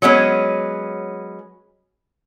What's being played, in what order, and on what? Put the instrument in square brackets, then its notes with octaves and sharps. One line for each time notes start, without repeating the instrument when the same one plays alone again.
[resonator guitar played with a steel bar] F#3 G#3 B3 C#4